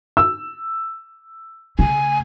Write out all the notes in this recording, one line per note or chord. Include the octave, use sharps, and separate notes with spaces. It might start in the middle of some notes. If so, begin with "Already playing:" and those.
E6
C#3 A3 G#5